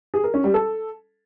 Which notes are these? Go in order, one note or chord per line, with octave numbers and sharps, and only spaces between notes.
G#4
A#4
C#4
G3
A4